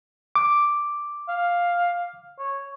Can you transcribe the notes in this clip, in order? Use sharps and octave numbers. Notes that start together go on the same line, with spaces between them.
D6
F5
C#5